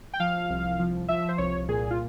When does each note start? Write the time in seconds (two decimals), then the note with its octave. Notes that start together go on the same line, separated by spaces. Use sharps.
0.14 G5
0.20 F3 F5
0.50 C2
0.79 F3
1.08 F3 E5
1.29 C5
1.38 C2 C#5
1.68 A#2 G#4
1.91 F4